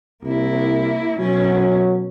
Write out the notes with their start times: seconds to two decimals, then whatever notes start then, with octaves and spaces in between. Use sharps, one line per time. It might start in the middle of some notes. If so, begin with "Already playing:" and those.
0.24 C2 A#3 E4
1.19 B2 F#3 C#4